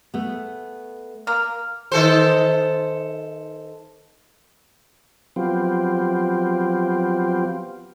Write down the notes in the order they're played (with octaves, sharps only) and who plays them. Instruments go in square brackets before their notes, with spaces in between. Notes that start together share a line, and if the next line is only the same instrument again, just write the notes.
[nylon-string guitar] A3 B3
[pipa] A#3 [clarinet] F6
[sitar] D#3 A4 C5
[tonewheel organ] F3 F#3 B3 C4 F4 G4